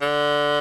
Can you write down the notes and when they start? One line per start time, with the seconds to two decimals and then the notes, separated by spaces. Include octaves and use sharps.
0.01 D3